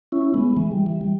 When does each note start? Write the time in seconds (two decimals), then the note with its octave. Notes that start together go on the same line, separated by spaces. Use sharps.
0.12 C#4 E4
0.34 G#3 B3
0.57 E3 G#3
0.72 G3
0.86 E3
1.01 G3